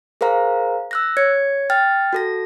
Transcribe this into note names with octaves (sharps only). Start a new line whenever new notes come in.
G#4 A#4 C5 F5 A#5
E6 F#6 A#6
C#5 G#6 C#7
G5 F6 A6
F#4 A4 A#6